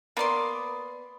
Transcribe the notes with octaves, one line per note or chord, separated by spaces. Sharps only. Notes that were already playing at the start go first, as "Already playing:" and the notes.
A#3 B3 D5 C6